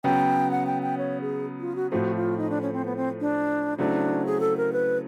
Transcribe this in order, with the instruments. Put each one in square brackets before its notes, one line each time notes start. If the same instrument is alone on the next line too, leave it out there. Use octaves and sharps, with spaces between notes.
[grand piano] C#3 F#3 B3 [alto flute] G5
[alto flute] F#5
G5
G5
C#5
G#4
F4
F#4
[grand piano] A2 F3 A3 C4 [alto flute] F#4
[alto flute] F4
D#4
D4
C#4
C4
B3
C4
D4
[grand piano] C#3 F#3 A3 C4 E4 [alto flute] D4
[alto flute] G#4
A4
A#4
B4